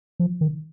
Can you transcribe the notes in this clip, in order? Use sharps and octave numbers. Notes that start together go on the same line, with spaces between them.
F3
D#3